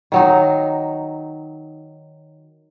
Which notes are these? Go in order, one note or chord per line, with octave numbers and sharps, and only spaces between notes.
D#3 F#3 D#4